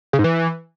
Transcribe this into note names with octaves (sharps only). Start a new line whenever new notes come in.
C#3
G#2
E3